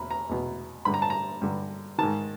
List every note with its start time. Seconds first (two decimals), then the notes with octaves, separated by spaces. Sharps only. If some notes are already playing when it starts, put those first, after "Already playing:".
Already playing: E2 B2 B5
0.11 A#5
0.29 E2 B2
0.85 G2 D3 B5
0.94 A#5
1.02 A5
1.10 A#5
1.42 G2 D3
1.98 G#2 D#3 A5